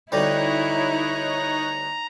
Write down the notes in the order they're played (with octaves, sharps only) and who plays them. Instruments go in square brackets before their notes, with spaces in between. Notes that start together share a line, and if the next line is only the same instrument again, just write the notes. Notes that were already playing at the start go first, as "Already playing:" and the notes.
[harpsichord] D2 B2 G3 [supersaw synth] D#4 C#5 F#6 [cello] E4 [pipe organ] A#5